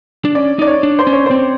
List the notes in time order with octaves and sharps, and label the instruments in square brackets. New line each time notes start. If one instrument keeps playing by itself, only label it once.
[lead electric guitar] D4
[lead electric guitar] C#4 [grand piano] D5
[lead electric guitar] D#4 [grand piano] D5
[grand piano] C#5
[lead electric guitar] D4
[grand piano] C5
[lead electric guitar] C#4
[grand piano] C#5
[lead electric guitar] C4 [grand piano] C5